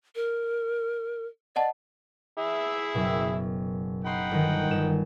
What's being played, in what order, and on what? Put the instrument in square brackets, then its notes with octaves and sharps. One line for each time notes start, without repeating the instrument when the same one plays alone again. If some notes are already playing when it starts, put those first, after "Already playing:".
[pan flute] A#4
[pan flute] D5 [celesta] D#5 F#5 A5
[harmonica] E4 G#4 E5
[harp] F#1 B2
[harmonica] D#4 F#5 G5 [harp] B5 C6
[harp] G1 D#3
G1 E7